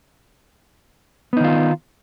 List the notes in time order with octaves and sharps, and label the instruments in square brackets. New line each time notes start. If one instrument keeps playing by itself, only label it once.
[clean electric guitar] B3
D#4
D#3
F4